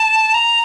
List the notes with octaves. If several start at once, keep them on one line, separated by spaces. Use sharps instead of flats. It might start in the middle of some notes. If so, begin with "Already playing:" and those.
Already playing: A5
A#5